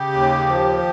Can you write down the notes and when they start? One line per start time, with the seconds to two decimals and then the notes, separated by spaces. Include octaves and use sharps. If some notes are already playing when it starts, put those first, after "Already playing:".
Already playing: C#3 G4
0.13 D#2
0.48 F3